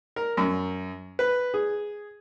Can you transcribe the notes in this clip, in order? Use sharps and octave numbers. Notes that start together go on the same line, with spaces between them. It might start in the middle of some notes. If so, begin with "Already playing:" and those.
A#4
F#2
B4
G#4